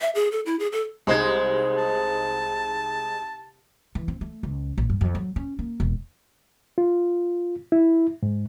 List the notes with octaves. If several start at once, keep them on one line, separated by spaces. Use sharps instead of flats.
E5
G#4
A4
E4
G#4
A4
C2 G#3 D#4 C5 G#6
A5
E3
C4
A3
C#2
A#1
G2
F2
F#3
C#4
A#3
E1
F4
E4
G#2